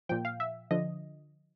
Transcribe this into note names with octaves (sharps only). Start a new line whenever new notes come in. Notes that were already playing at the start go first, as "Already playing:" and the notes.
A#2 F3 G5
F5
E5
D3 F3 D#5